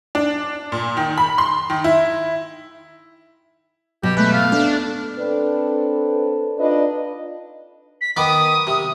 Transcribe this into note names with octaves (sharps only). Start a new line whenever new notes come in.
D4
A#2
D#3
B5
C6
D#3
E4
B2 F#3 G4
G#3 A3 B4
F5
A3 D4
C4 D4 A4 B4
D4 D#4 F4 B4 D5 D#5
B6
D#3 B3 D6 D#6
C3